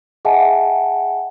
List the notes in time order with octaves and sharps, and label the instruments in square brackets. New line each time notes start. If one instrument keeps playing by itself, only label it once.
[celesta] G#4 D#5 E5 F#5 G#5 A5